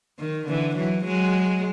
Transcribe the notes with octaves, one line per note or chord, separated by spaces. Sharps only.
D#3
D3 E3
E3 F#3
F#3 G#3